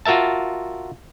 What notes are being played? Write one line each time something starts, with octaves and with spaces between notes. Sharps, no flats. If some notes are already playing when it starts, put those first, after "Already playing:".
F4 F#4 A#4 E5 A5